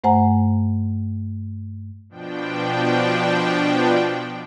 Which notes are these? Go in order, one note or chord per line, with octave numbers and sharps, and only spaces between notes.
G2 A3 C5 F#5 G#5 A#5
B2 F3 D4 G5